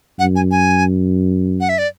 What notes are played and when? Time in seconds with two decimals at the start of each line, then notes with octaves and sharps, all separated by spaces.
0.19 F#2 F#5
0.36 G#5
0.51 G#5
1.61 F#5
1.69 E5
1.78 D5